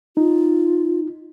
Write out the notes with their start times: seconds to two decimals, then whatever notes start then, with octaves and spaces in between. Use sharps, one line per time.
0.17 D#4 F4